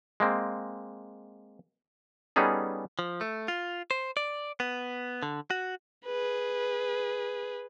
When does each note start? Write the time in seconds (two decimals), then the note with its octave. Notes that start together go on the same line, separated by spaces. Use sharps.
0.20 G#3 A#3 C4
2.36 G3 B3 C#4 D#4 G#4 A4
2.99 F3
3.21 A3
3.48 F4
3.91 C5
4.17 D5
4.60 B3
5.23 D3
5.50 F#4
6.05 G#4 B4